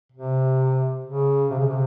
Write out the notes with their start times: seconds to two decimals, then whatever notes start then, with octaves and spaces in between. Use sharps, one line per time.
0.13 C3
1.04 C#3
1.51 C3
1.59 C#3
1.67 C3